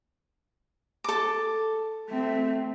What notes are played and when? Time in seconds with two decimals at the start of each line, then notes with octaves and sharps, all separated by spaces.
1.04 A4 D6
2.09 A3 C4